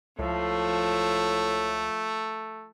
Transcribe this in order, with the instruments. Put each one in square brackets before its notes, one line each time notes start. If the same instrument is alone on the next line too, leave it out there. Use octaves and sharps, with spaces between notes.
[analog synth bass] C#2 [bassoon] A2 [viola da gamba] F3 [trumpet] A3